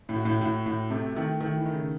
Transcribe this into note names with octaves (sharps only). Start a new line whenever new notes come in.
A2
F#4
A2
A2 F#4
A2 F#4
C3 A3
D#3 A3
D#3 A3
E3
D#3
C#3